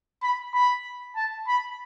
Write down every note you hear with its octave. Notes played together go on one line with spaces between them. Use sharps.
B5
B5
A5
B5